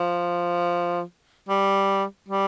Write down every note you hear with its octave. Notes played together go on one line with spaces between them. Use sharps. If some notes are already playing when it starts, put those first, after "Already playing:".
Already playing: F3
G3
G3